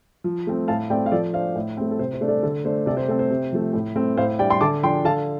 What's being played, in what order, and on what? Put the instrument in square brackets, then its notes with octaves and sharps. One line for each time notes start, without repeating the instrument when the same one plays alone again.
[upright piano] F3
A3 C4
A2 F5 A5
A3 C4 D5 G5
F5
F3 A4 D5
D4 C5 F5
A2
A3 C4
A4
C3 C5
C5
A3 D4
A4 D5
D3 A4
A3 D4 C5
C3 A4 D5
C5
A3 C4 A4
C5
C3
F3 A3
A2
A3 C4
A2 C5 F5
G3 D4 D5 G5
G5 C6
D3 A5 D6
F3 D4 G5 C6
D3 F5 A5